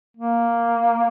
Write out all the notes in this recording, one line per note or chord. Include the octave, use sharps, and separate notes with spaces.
A#3